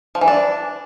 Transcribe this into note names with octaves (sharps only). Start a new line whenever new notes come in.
F3
E3
D4